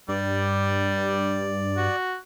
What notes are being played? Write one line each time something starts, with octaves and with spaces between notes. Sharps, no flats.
G2 G3 D5
F#4